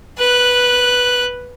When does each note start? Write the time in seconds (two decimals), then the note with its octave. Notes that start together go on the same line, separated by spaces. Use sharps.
0.18 B4 F#6